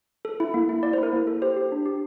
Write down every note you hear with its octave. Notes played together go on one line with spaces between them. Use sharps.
A4
E4
A#3
E4
A#3 D5
C5
E4 A#4
A#3
A4
G4 C5
G4
D4
G4